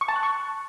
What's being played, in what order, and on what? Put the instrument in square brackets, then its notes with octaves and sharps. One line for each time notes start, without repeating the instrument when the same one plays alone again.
[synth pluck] C#6
A5
F#6
C#6